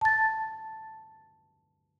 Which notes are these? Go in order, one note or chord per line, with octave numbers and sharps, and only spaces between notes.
A5 A6